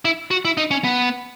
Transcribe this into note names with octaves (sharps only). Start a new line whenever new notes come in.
E4
F#4
E4
D#4
C#4
B3